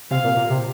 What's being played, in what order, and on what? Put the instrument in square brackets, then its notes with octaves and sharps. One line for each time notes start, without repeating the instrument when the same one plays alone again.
[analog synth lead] C3 [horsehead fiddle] F5
[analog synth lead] A#2
A#2
C3